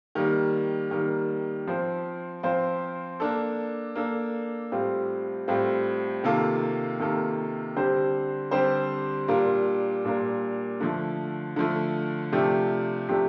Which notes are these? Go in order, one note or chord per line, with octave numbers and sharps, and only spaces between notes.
D#3 G3 A#3
D#3 G3 A#3
F3 C4 F4 C5
F3 C4 F4 C5
A#3 D4 A4
A#3 D4 A4
A2 G3 C4 F4
A2 G3 C4 F4
C3 D#3 A#3 F4 A4
C3 D#3 A#3 F4 A4
D3 G3 C4 G4 C5
D3 G3 C4 G4 C5
A#2 G3 D4 F4 A#4
A#2 G3 D4 F4 A#4
D3 F3 A3
D3 F3 A3
C3 F3 A3 D4 G4
C3 F3 A3 D4 G4